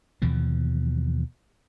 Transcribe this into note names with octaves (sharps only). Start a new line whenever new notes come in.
D#2 B2 E3 F3